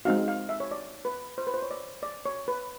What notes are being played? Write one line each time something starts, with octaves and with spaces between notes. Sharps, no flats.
G#3 C4 D#4 F#4 F5
F5
E5
C#5
D5
B4
C5
B4
C5
C#5
D5
D5
C#5
B4